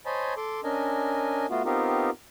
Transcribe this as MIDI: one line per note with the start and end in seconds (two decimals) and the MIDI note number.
0.06 0.34 72
0.06 0.34 73
0.06 0.34 75
0.06 0.34 80
0.06 0.34 81
0.06 0.34 83
0.37 0.61 69
0.37 0.61 84
0.37 0.61 86
0.64 1.46 61
0.64 1.46 62
0.64 1.46 70
0.64 1.46 75
0.64 1.46 80
1.50 1.62 57
1.50 1.62 59
1.50 1.62 65
1.50 1.62 66
1.65 2.10 59
1.65 2.10 60
1.65 2.10 63
1.65 2.10 65
1.65 2.10 67
1.65 2.10 70